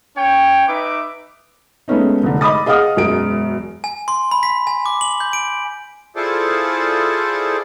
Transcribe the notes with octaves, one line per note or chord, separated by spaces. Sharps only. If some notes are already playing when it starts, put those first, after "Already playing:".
C#4 C#5 G5
D#4 B4 E5 D6
G#3 A3 B3 C#4 D#4
F1 D3
D#5 B5 D6 D#6 A6
G#4 D#5 F5 F#5 D#6 F6
E1 F#2 G#3 D7
G#5
C6
B5
B6
G#5
D6
F#7
G6
D7
E4 F4 G#4 A4 C5 D5